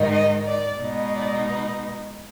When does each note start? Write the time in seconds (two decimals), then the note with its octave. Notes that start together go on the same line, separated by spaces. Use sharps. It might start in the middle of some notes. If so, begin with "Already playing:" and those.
Already playing: G#2 D#3 G#3 D#4
0.11 D#5
0.46 D5
0.79 B2 G#3 D#4
1.14 D5
1.49 B4